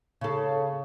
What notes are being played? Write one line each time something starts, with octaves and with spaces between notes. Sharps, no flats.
C#3 A4